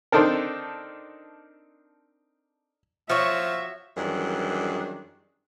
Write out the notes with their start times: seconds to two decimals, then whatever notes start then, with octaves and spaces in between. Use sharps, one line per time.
0.12 C4 D4 D#4 A4 A#4
3.09 F3 F#4 C#5 E5
3.97 F#2 D#3 E3 G3 G#3 D4